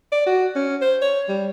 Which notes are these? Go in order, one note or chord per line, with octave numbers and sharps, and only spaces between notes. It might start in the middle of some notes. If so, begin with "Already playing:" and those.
D5
F#4
C#4
C5
C#5
G3